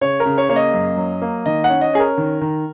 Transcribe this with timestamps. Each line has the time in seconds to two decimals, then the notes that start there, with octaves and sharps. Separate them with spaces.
0.01 C#3 C#5
0.20 A#4
0.26 C#3
0.38 C#5
0.49 A#3 C#5
0.56 D#5
0.73 F#2
0.97 F#3
1.22 A#3
1.46 D#3 D#5
1.64 C#4 F#5
1.81 D#5
1.93 C#4 G#4
2.00 A#4
2.18 D#3
2.41 D#3